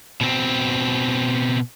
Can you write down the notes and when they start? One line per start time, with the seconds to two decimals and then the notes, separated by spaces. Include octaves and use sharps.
0.21 B2 C4